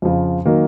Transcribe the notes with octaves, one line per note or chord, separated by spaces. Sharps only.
F2 C#3 F3
D#3 F#3 A#3